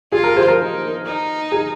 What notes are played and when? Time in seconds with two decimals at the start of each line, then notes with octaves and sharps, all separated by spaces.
0.12 F4 G#4
0.24 A#4
0.36 G#4 C5
0.48 A#4
0.59 D#4
1.05 D#4
1.52 G#4